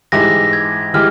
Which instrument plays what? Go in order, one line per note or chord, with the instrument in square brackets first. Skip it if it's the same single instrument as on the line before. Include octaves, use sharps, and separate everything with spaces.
[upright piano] G#2 E3 G#3 E4 G4 [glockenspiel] A#6
[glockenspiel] G#6
[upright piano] E3 G#3 G4 [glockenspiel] F6